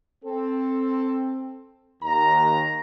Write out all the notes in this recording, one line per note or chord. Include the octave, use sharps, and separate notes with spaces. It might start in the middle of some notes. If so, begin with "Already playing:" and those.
C4 A4
D#2 A#5